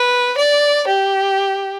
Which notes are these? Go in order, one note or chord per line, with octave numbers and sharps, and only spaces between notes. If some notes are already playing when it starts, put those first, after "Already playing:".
Already playing: B4
D5
G4